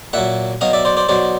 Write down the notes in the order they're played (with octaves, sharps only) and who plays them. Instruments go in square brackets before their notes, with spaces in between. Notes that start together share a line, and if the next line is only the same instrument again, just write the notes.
[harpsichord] A#2 F#3 E5 F#5
B2 F#3 D#5 F5
D5 E5
C5 D5
C5 D5
B2 F#3 C5 D5